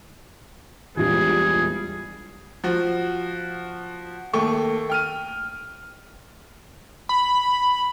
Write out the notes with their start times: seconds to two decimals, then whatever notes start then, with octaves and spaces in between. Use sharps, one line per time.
0.97 A#1 E2 G2 A#2 E3 G3 G#3 G#4
2.64 F3 F#4
4.33 D#2 A3 G5 C#6
4.90 G5 F6 D#7
7.09 B5